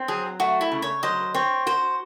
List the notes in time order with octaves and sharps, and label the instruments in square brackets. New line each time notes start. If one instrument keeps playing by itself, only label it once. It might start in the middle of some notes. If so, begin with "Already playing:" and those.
Already playing: [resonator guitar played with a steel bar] C4
[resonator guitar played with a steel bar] F#3 [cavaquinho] G#4
[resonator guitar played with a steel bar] A3 [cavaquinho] F#4
[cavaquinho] E4
[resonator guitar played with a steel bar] C#3
[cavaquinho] C#5
[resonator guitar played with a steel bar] F#3 [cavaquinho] C5 D#5
[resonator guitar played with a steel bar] C4 [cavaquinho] C#5
[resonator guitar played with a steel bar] F#4 [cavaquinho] C5